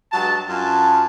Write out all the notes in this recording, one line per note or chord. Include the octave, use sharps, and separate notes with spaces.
G2 F#3 G#3 A5
F#2 F4 G#5 A5